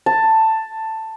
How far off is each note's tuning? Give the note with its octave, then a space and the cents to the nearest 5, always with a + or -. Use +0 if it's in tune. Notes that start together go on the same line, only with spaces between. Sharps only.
A5 +10